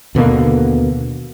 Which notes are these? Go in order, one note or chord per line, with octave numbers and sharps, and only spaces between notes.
D#2 B2 D3 A#3